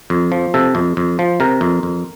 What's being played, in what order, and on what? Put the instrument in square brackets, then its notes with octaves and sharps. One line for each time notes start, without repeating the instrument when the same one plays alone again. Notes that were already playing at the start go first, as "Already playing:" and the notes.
[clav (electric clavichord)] F2
F3
C3 A4
F2
F2
F3
C3 A#4
F2
F2